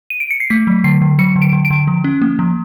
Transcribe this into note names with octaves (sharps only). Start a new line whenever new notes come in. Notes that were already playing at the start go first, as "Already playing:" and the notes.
D#7
D7
C#7
C7
A3 B6
F#3
D3 C7
D3
F#3 C#7
D3
D7
D3
D7
D3
F3
C#4
A#3
F3